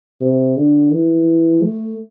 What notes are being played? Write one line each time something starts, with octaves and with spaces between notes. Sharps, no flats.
C3
D3
E3
A3